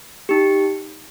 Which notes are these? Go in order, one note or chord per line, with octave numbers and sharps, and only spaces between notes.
D#4 G4